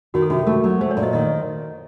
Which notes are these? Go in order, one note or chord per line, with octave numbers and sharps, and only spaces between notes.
D#3 F#4
A4
C3 F#4
A3 A#4
F#3 A#4
A3 C5
C#5
A#2
D#5
D#3 D#5